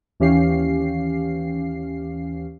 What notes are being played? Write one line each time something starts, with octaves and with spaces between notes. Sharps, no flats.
D#2 E3 C#4 G4 F5 C7